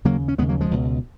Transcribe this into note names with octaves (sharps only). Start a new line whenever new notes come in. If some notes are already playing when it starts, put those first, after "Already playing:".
D#2 C#3 F#3 A#3
C#4
D#2 C#3 G#3 B3
F#3 A#3
F3 G#3
C#2 B2